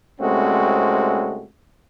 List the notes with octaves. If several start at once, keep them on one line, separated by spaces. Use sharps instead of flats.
C2 G#3 A3 C4 C#4 F#4